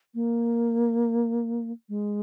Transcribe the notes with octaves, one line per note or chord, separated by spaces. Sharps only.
A#3
G#3